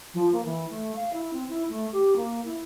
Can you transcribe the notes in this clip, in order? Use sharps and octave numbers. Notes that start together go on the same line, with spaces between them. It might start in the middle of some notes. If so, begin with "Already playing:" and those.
F3
A#3
E3
A3
F5
E4
C4
E4
A3
G4
A#3
E4